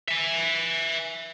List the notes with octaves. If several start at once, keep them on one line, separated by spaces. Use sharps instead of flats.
E5 G#5